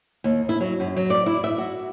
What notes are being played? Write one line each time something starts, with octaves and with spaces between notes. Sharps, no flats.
D#2
E4
F#3
F#2
F#3
D5
E4
E5
F#4